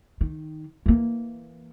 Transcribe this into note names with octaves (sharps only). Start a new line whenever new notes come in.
D#3
E3 A#3